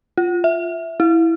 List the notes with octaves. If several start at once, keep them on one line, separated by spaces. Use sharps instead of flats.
F4
E5
E4